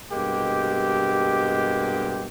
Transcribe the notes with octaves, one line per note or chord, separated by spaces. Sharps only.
G2 B2 G#3 A#3 G4